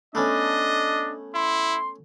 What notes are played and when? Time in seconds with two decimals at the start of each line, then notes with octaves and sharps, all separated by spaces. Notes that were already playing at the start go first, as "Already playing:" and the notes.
0.15 A3 B3 C#4 D4 D#5
1.35 E4 C6